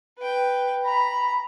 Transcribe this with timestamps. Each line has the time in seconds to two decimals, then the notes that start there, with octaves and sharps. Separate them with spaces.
0.18 B4 G5
0.85 A#5 B5